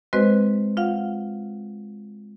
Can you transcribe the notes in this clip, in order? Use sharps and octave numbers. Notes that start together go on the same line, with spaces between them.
G#3 C4 F#4 B4 C5 D#5
F4 F5 F#5